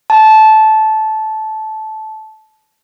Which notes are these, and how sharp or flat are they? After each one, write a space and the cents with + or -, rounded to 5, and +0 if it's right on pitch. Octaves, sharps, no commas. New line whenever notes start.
A5 -15